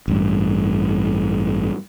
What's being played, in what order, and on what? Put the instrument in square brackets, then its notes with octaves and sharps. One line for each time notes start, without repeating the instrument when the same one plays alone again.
[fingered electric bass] A1 G2